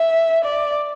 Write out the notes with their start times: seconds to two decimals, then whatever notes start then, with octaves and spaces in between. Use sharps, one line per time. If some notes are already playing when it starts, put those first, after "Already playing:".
Already playing: E5
0.45 D5